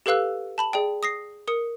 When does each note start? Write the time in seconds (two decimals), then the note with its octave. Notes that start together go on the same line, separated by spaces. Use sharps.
0.06 G4 A4 B4 F5 E6 F#6
0.58 A5 B5 F#7
0.73 G#4 D5 G5
1.03 D#6 A#6 C7
1.48 A#4 D#6 C#7